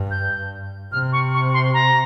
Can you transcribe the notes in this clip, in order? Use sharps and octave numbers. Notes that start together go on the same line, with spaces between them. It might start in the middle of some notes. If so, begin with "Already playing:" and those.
Already playing: G2
G6
C3 F6
C#6
C#6
C6
A#5